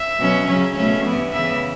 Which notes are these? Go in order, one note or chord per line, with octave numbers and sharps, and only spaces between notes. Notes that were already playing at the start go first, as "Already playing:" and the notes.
Already playing: E5
B2 F#3 C#4
C#3 F#3 C#4
B2 A3 C#4 E5
G2 E3 B3
C#3 E3 B3 E5